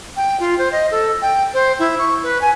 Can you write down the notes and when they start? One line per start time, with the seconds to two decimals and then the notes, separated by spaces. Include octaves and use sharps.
0.16 G5
0.40 F4
0.58 C5
0.72 D#5
0.91 A4
1.22 G5
1.54 C5
1.79 E4
1.99 C#6
2.23 B4
2.41 G#5